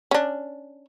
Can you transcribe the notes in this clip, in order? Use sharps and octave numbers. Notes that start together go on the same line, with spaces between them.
C#4 D4